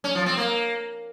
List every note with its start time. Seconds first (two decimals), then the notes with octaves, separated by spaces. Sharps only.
0.04 C#4
0.15 F3
0.26 C4
0.37 A#3